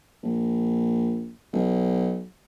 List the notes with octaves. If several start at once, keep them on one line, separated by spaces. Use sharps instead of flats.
A#1
B1